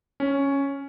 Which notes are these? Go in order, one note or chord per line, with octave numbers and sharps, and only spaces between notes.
C#4